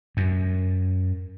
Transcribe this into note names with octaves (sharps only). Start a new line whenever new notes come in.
F#2